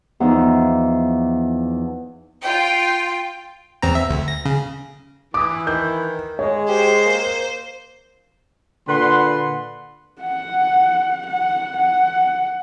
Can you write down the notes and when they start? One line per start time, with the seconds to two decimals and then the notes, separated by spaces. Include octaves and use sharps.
0.20 E2 F3 D#4
2.43 F4 G5
3.82 E2 C4 A#5
3.95 E5
4.10 D2
4.28 A#6
4.45 C#3
5.34 E3 D6 D#6
5.67 D#3 G6
6.39 G#3 C#5
6.69 G4 C5
7.06 A#3
8.89 A#2 D3 B4 F#5 C6
10.21 F#5
11.26 F#5
11.77 F#5